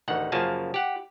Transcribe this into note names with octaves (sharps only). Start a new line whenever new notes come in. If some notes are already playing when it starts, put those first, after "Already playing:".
A1 D2 D#3 F#5
F#2 C#3 F3 A#3 G#5 A5
G4 F#5